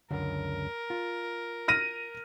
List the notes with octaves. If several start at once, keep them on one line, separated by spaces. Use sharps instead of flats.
C#2 F#2 D3 A#4
F4
F6 A#6 D#7